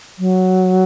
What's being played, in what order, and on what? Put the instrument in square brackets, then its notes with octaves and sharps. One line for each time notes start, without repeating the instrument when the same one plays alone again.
[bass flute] F#3